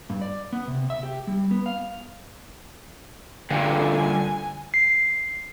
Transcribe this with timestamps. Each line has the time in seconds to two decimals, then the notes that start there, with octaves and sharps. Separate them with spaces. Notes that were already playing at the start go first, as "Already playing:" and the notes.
0.10 G2
0.21 D5
0.53 B3
0.67 C3
0.90 E5
1.03 G4
1.27 G3
1.51 B3
1.66 F5
3.50 G2 A#2 D3 G#5
4.74 C7